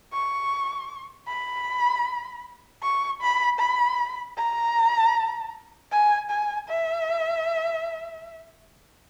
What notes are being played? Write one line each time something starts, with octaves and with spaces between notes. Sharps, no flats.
C#6
B5
C#6
B5
B5
A#5
G#5
G#5
E5